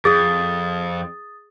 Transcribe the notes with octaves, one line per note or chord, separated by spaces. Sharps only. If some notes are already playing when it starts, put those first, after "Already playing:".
F2 G#4 D#6 A6